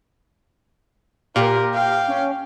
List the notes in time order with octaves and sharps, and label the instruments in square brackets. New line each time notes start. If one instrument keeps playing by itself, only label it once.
[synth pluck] A#2 [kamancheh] F4 A#4 [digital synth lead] G4
[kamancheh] F5 G5
[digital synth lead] C#4